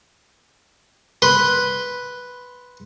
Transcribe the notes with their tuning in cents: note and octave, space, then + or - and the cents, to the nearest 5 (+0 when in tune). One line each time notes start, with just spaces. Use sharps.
B4 +0 C6 +0